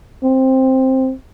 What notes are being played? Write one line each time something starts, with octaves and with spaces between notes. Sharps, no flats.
C4